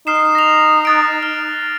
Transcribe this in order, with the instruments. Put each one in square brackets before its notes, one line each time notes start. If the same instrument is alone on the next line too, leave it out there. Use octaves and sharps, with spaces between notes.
[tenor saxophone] D#4 [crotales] F6 C7 E7
[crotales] A#6 F7
F#6 A6 D7
F6